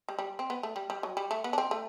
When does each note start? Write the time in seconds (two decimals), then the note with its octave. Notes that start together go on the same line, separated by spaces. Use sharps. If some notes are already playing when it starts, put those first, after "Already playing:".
0.09 G3
0.19 G3
0.39 C4
0.50 B3
0.63 A3
0.76 G3
0.90 G3
1.03 F#3
1.17 G3
1.31 A3
1.44 B3
1.53 D4
1.58 C4
1.71 A3